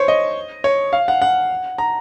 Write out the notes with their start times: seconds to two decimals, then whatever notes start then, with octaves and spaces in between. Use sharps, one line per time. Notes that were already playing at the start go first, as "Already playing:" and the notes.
Already playing: C5 C#5
0.08 D#5
0.64 C#5
0.93 F5
1.08 F#5
1.22 F#5
1.78 A#5